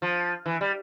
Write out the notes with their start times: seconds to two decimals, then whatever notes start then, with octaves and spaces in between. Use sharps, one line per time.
0.02 F3
0.46 E3
0.61 G3